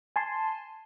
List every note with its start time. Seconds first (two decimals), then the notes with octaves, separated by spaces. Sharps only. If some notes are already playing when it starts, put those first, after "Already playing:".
0.16 G#5 A5 C6